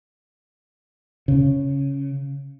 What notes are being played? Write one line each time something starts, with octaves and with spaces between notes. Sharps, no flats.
C#3